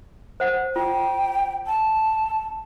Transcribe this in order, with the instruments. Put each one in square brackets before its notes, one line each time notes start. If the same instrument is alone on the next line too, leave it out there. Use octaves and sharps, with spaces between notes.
[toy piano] C5 F#5
[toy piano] F4 [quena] G5
[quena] A5